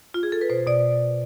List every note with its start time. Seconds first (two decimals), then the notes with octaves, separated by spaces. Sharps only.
0.14 F4
0.23 G#4
0.32 A4
0.41 B4
0.50 B2 C5
0.67 B2 D5